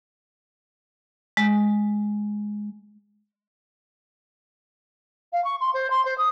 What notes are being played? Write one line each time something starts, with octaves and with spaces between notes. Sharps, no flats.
G#3
F5
C#6
C6
C5
C6
C5
D#6